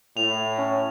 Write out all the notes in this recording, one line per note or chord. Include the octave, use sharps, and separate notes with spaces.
A2 F7
C#4